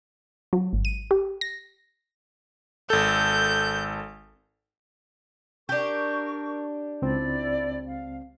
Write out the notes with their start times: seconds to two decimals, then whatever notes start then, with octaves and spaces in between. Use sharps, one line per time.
0.53 F#3
0.73 G#1
0.85 D#7
1.11 G4
1.41 A#6
2.90 G#1 A4 G6
5.69 D4 G4 A#4 C#6
7.02 C#2 C4 E4 D5
7.86 F5